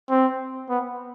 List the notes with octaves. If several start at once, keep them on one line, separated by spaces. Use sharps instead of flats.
C4
B3